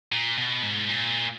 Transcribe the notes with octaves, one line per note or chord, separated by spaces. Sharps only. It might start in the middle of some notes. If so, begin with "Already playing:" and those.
A#2
B2
G#2
A#2